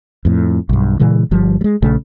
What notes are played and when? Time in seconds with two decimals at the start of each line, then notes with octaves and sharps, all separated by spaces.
0.25 F2 A2
0.69 B1 G2
0.99 A#2 C#3 E3 G#3
1.31 G1 F3 G3
1.61 G3 G#3
1.82 A#1 C#3 A3